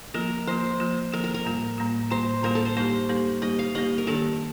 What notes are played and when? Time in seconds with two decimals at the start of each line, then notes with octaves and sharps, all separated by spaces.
0.14 F3 A#3 F4 A#4
0.47 F3 A#3 F4 C5
0.80 F3 A#3 F4
1.12 F3 A#3 F4 A#4
1.24 A#4
1.34 A#4
1.45 A2 G3 A#3 F4
1.78 A2 G3 A#3 F4
2.11 A2 G3 A#3 F4 C5
2.43 A2 G3 A#3 F4 A#4
2.55 A4
2.65 C5
2.76 G3 A#3 D#4 G4 C5
3.09 G3 A#3 D#4 G4
3.42 G3 A#3 D#4 G4 D#5
3.59 F5
3.75 G3 A#3 D#4 G4 D#5
3.98 A#4
4.07 D#3 A#3 D4 G4 A4